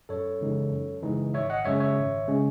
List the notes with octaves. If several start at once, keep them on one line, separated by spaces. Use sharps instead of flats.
F#2 A4 C#5
C#3 E3 G#3 D#4
F#2
C#3 E3 G#3 D#4
G#1 C#5 E5
D#5 F#5
F#2 C#3 G#3 C#4 C#5 E5
C#5 E5
G#1
C#3 G#3 C#4